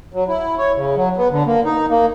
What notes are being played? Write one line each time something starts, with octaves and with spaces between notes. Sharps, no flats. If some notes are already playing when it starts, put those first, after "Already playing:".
F#3
E4
C#5
C#3
F#3
B3
D3
A#3
D#4
A#3